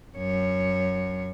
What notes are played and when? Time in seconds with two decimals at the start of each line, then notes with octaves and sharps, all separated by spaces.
0.18 F#2 C#5